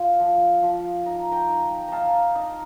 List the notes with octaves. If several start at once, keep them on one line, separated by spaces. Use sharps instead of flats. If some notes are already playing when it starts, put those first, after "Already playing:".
Already playing: F4
F3
F3
D#4 A#5
G5 A#5
D#4
D#4 F5 A5 A#5
D#4